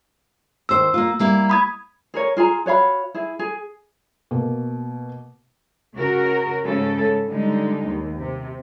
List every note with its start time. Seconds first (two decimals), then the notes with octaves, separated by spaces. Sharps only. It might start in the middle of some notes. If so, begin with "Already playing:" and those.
0.69 D#2 C5 E6
0.94 A#3 F4
1.19 G3 A#3 E4
1.50 B5 D#6 G#6
2.14 G#4 A#4 C#5
2.37 F4 G#4 G#5 A#5
2.66 F#4 C#5 F5 B5
3.15 E4 G#4
3.39 G#4
4.31 B2 A#3
5.95 C#3 F#4 A#4
6.63 G#2 C#3 A4
7.28 D3 G3 G#3 D#4
7.85 D#2
8.19 C3